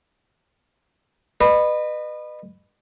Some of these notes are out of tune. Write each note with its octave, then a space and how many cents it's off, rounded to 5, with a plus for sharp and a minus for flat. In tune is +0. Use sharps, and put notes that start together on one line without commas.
B4 +0 D#5 -35